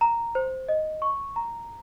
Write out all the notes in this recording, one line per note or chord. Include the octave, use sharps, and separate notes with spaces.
A#5
C5
D#5
C#6
A#5